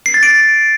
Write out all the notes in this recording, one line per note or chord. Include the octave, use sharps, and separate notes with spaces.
C7
A6
D7